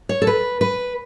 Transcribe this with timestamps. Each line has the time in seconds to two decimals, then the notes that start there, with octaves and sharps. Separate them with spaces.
0.09 C#5
0.22 A4
0.27 B4
0.61 B4